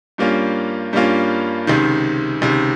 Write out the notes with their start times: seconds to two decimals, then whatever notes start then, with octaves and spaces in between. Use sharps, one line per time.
0.18 G2 G3 A#3 C#4 F4
0.93 G2 G3 A#3 C#4 F4
1.67 C#2 C3 D#3
2.42 C#2 C3 D#3